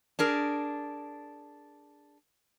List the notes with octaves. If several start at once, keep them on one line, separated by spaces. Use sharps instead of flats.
D4 G#4 A#4